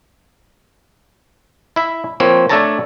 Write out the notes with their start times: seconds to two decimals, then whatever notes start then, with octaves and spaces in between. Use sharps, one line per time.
1.76 E4 E5
2.20 F3 A#3 C4 C#5
2.49 A3 D4 A4 C#5 A5 A#5